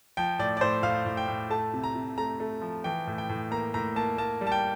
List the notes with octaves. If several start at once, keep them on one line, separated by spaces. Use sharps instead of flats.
F3 G5
A2 D5
D5
A2 C5
A2 F5
A2
G5
A2
A3 A5
C3
A#5
C3
A3 A#5
A3
F3
E3 G5
A2
G5
A2
A#3 A#5
A2 A#5
A#3 A5
A#3 A5
G3
A5
G5